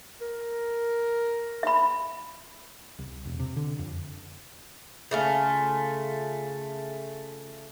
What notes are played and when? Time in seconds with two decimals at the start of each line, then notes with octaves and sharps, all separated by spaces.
0.21 A#4
1.63 E5 B5
2.99 C2
3.26 E1
3.40 C3
3.57 D3
3.79 F2
5.11 C#3 A3 F4